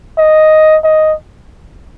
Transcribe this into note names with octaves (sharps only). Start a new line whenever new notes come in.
D#5
D#5